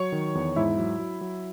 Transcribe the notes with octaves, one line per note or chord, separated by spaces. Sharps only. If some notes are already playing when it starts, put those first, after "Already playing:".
Already playing: F#3 C#5 C#6
D#3
E2
G#2 E4 E5
F#3
F#3
F#3